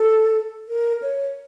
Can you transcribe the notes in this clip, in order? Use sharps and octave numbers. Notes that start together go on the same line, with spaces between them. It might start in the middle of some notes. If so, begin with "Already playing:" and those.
Already playing: A4
A#4
C#5